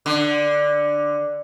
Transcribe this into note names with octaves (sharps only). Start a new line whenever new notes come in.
D3